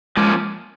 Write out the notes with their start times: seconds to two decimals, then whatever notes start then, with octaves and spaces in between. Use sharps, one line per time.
0.17 F3 G#3 A#3 C#4